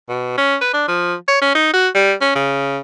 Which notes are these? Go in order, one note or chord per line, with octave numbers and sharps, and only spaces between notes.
B2
C#4
B4
D4
F3
C#5
C#4
D#4
F#4
G3
C#4
C#3